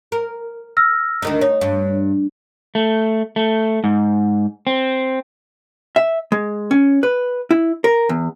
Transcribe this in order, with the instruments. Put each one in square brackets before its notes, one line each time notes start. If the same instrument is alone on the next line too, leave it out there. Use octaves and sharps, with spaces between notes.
[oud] A#4
[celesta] E6 F6 A#6
[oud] D2 D#3 D#4
[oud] D#4 [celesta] C#5
[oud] G2
[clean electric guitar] A3
A3
G#2
C4
[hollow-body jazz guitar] E5
G#3
C#4
B4
E4
A#4
E2